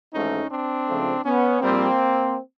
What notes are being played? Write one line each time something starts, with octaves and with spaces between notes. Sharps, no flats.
G#1 G#2 E3 A3 C#4 D#4
C4 D4
C#2 C#3 F3 A3
B3 C#4
A#1 A#2 G3 A#3 C4